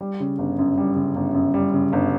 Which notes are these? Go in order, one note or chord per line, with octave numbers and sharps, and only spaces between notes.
G3
C#3
G1
F#2
G3
C#3
G1
F#2
G3
C#3
G1